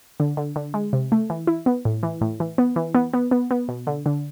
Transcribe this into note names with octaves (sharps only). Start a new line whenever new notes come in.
D3
D3
D3
G#3
C3
A3
E3
E4
B3
A2
E3
A2
E3
B3
E3
B3
B3
B3
B3
B2
D3
D3